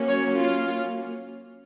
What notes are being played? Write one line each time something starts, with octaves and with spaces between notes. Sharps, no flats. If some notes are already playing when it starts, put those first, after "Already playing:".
Already playing: F#3 A#3 C#4
C#5
F4